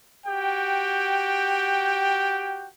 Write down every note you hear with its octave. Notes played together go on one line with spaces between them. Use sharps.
F#4 G4 G5